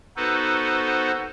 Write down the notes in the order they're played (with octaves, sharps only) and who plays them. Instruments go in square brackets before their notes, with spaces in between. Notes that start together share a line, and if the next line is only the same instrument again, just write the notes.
[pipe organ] B3 D#4 F#4 A4 B4 C5